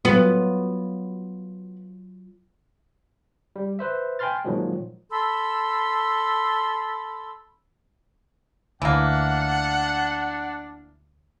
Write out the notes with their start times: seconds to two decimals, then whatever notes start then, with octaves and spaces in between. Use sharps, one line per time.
0.05 F#3 B3 F4
3.56 G3
3.79 B4 C5 E5
4.19 G5 G#5 B5 C6 F6 A6
4.45 A#2 D#3 F3 F#3 G#3
5.10 A4 B5 C6 E6
8.82 D2 E3 A#3 D4 F#5